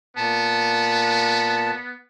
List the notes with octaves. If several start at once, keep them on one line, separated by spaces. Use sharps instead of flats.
A#2 B3 A5